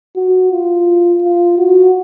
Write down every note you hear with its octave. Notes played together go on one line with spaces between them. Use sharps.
F#4
F4
F4
F#4